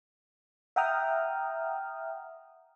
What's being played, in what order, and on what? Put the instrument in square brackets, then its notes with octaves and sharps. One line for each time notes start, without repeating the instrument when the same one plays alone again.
[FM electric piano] E5 F#5 G5 A#5 D#6 F6